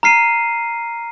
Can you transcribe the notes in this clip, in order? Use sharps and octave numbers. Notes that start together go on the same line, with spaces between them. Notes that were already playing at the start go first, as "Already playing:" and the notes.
A#5 F6 C7 D#7